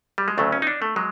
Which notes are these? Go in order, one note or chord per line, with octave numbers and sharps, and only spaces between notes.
G3
G#3
D2 C#3 F#3 A3
C#4
D#4
D4
A3
F#3 G#3